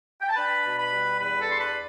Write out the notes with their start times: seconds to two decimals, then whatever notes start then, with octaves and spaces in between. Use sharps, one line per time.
0.22 G5
0.29 A5
0.36 D4 B4 B5
0.64 B2
0.78 B4 B5
0.92 G3
1.19 E2 B4 B5
1.40 A4 A5
1.47 D4 C6
1.61 B4 B5